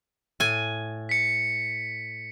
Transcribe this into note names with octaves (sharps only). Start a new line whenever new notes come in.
A2 G#5
B6 C#7